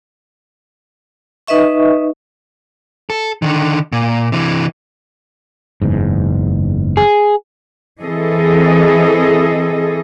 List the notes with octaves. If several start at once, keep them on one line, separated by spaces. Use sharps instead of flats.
D#4 B4 D#5 E5 C#6
A4
D3 D#3
A#2
C3 E3
F#1 E2 G#2
G#4
E3 C4 G#4 A4 D#5